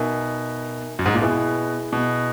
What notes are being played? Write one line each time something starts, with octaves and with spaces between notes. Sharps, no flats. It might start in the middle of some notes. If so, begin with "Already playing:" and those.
Already playing: B2 D#4 A#4 E5 G#5
F#2
G#2
A#2
B2 E4 G#4 B4 E5 G#5
B2